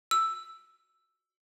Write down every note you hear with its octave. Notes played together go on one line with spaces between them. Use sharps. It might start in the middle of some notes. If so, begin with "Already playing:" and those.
E6